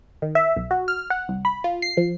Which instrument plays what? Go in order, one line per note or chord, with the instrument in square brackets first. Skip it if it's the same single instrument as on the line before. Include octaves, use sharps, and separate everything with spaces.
[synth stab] D#3
E5
B1
F#4
F6
F#5
C2
B5
F4
C7
F3